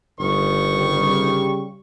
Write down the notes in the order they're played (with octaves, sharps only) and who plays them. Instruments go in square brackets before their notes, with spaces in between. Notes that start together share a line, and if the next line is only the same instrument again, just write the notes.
[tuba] G1 [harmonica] D#3 C#6
[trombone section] C#3 G3